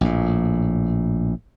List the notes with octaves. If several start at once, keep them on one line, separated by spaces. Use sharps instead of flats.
A#1 A2